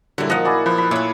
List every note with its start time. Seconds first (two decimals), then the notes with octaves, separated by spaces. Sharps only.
0.18 A#2 D3 F#3 G3 E4
0.30 F3 A#3 D#4 D#5 F#5
0.45 E4 F#4 G#4 D5
0.66 F3 B4
0.78 B5
0.91 A#2 A3 E4 C#5